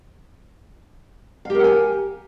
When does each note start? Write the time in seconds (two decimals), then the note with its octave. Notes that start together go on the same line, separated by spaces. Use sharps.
1.45 F5
1.50 G4
1.55 A#4
1.59 F#5
1.64 G#5